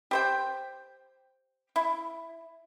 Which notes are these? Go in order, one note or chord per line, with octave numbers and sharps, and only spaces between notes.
G4 C5 G5
E4